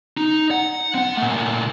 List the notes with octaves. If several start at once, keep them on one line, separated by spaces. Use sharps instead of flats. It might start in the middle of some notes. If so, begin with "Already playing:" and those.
D#4
F#5
C4 F#5
A#2 A3